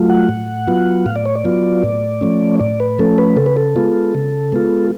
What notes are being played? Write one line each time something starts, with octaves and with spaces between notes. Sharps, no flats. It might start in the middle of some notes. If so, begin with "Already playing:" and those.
Already playing: F#3 A3 F4
F#5
A2
F#3 B3 F4
A2 F5
D5
C#5
D5
F#3 B3 F4
A2
F3 A3 C#4
A2 D5
B4
F3 A3 C#4 A4
B4
C#3 A4
B4
A4
G#3 B3 F4
C#3
G#3 B3 F4